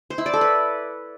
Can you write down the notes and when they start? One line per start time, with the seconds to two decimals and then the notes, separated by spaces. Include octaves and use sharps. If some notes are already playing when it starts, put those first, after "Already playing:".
0.10 C5
0.18 E4
0.26 D5
0.34 A4
0.41 B4